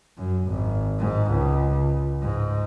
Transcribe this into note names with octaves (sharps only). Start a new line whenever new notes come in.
F#2
G#1
G#2
C#2
G#2